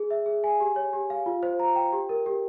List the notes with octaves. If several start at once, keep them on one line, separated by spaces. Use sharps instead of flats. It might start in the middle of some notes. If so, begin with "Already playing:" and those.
Already playing: G#4
E5
G#4
G#5
G4
C#5
G4
F5
F4
C5
A#5
G5
G4
A#4
G4